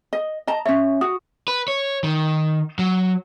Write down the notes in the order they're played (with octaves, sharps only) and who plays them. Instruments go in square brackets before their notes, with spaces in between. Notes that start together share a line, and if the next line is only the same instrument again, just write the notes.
[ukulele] D#5
D#5 A5 A#5
[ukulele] C#4 C#5 [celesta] E5
[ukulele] F#4 [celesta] D#6
[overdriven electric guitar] B4
C#5
D#3
F#3